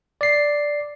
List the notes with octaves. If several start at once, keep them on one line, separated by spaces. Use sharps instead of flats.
D5 C7